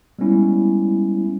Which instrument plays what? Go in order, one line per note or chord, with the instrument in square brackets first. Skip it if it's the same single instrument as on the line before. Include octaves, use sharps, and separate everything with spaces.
[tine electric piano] G3 G#3 B3 C#4 E4